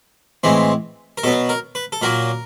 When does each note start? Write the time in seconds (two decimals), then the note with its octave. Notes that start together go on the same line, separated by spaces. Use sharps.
0.43 A2 E3 G#3 C4
1.18 A#4
1.23 B2 F#3 B3 A4
1.49 A#4
1.75 B4
1.92 A4
2.02 A#2 F#3 A#3 A#4